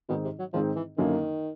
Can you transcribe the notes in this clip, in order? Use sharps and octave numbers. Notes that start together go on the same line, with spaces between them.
G#2 B2 D#3 G#3 C4 D#4
C3
F#3
G#2 D#3 F3 G#3 C4 D#4
E3
F#2 D3 D#3 F#3 A#3